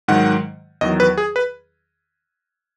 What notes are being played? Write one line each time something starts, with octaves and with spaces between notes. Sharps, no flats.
G#2 D#3 F#3 F#5
E2 D#3 F#3 D#5
B4
G#4
B4